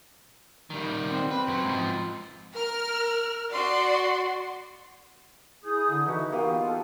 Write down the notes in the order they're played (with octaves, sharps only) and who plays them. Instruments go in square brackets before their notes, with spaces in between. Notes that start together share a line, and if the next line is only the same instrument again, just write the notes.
[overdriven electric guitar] D#3 G3
[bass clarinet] C4
[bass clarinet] C4 [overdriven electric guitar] B4
[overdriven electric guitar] F#2 F#3
G#2 F3
[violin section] A#4 F6
F#4 D5 C6
[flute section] E4 D#6 G6 [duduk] G#4
[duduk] D3
[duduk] E3 [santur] D#4 F#4 [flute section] E5
[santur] A#3 G4 D#5 [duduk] B3 [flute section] F4
[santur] A4